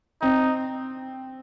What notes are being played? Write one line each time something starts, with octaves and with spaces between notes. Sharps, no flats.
C4 D#4